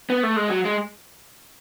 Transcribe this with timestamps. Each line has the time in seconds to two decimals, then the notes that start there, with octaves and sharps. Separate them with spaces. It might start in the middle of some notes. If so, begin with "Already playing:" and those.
0.10 B3
0.23 A3
0.36 G#3
0.50 F#3
0.65 G#3